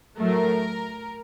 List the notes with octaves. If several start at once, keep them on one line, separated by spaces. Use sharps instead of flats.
A2 F#3 A3 A#4